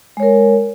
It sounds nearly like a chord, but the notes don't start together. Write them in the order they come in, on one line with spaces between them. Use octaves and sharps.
G#3 C#5 A#4